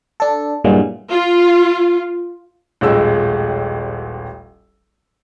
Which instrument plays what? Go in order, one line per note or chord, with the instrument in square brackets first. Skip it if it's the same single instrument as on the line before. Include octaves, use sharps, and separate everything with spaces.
[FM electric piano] D4 A4
G2 A#2 E3 F#3 G#3
[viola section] F4
[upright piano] D#1 A1 G#3 E6